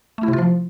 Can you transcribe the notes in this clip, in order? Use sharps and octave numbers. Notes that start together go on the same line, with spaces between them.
A3
E4
C3
F4
F3